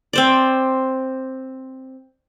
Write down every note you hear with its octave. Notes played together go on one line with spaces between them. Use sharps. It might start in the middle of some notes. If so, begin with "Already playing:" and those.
C4 C5 D5